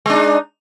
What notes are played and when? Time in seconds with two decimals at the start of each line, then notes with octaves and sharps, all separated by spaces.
0.06 G#3
0.10 D4
0.14 D#4